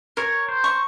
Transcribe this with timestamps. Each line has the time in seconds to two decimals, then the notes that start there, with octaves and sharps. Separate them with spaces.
0.17 A#4 C#5
0.49 C5
0.64 C#6